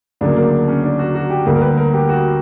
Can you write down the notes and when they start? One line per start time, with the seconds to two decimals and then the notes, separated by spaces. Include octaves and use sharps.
0.21 D2 C#3 F#3 A#3 D4
0.36 A#3
0.68 C#4
0.84 D4
0.99 F#4
1.15 F#4
1.30 G4
1.46 D2 D3 G3 A#3
1.55 A#4
1.62 B4
1.78 A#4
1.93 G4
2.09 F#4